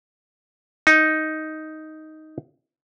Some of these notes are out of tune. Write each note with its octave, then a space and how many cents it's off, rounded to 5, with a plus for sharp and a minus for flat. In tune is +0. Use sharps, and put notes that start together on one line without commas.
D#4 +5